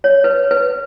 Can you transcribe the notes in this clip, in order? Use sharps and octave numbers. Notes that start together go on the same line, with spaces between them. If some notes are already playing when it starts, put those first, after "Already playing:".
C#5
B4
B4